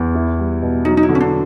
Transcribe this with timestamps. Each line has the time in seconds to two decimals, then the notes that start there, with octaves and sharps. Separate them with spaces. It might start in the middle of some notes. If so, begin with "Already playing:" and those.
Already playing: E2
0.15 E4
0.38 G3
0.62 B2
0.85 F#3 D#4
0.97 D#4
1.03 E4
1.09 D3
1.15 C#4
1.21 D4